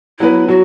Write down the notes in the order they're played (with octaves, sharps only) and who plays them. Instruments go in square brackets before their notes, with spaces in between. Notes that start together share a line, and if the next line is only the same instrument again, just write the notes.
[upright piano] F#3 B3 F#4 B4 [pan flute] E4
[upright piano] F#3 [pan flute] F#4